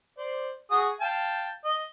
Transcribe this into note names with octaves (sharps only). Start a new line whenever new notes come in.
C5 D5
F#4 G#4 D#6
F5 G5 A5
D#5